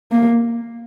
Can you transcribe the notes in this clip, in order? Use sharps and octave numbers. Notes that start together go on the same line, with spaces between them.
A#3